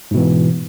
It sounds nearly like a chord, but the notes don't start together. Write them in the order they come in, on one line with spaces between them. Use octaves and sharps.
G#2 B2 E3